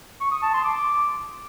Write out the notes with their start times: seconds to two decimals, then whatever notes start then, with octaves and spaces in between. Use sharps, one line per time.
0.21 C#6
0.32 D#6
0.43 A5
0.54 C6
0.65 D6